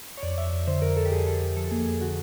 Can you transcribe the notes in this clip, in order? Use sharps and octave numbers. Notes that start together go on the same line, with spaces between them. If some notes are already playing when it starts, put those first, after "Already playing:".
C#5
F2 D5
F2 E5
F2 E5
D3 C5
F2 A#4
F2 A4
G4
F2 G#4
F2 A4
F2
F3 A4
A#3 G#4
F2 G#4
D3 F#4